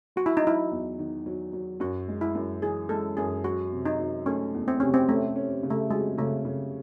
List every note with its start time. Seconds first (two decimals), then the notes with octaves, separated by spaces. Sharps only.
0.16 F#3 F#4
0.26 E4
0.37 D#4
0.44 F#3 E4
0.71 E2
0.99 D#3
1.26 F#3
1.53 F#3
1.80 F#2 F#4
2.08 G#3
2.21 E4
2.35 F#2
2.62 E3 G#4
2.89 G#3 A4
3.17 F#2 G#4
3.44 F#3 F#4
3.72 C3
3.86 D#4
4.00 F#3
4.26 A3 C#4
4.54 E2
4.68 C4
4.80 C3 C#4
4.94 C4
5.09 A3 C#4
5.35 C#4
5.63 C#3
5.70 A3
5.90 F#3 G#3
6.17 C#3 A3
6.45 C#3